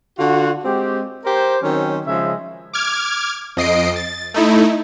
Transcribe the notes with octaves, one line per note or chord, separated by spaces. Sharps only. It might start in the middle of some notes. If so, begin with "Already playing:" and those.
D3 F4 F#4
G#3 C4 G4
G4 A#4 C5
D#3 F#3 C4 C#4
C#3 F3 G#3 E5
D6 F6 G#6
F2 D#5 C7 D7
A6
A3 D#4 E4